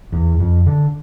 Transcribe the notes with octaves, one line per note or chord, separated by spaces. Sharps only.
E2
F2
D3